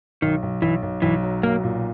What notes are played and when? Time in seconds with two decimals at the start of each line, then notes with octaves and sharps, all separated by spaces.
0.22 B1 D#3
0.42 B1
0.62 B1 E3
0.83 B1
1.02 B1 E3
1.22 F#3
1.43 B1 A#3
1.63 A#2